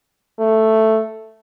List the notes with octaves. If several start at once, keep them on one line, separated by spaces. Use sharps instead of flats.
A3